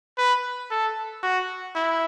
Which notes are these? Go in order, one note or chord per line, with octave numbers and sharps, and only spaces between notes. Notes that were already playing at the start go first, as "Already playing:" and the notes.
B4
A4
F#4
E4